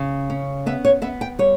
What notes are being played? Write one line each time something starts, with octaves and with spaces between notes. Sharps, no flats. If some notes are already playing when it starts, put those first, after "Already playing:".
Already playing: C#3
C#4
B3 E5
C#5
B3 E5
G5
G3 C#5